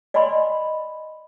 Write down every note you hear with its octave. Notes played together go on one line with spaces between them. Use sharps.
D5 D#5 G#5 B5 C6